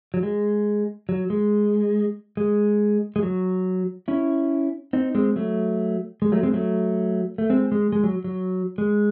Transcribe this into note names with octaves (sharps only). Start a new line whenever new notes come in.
F#3
G#3
F#3
G#3
G#3
G#3
F#3
C#4 E4
C4 D#4
G#3 C4
F#3 A3
G#3
F#3 A3
G#3 C4
F#3 A3
A3
G#3 C4
G#3
G#3
F#3
F#3
G#3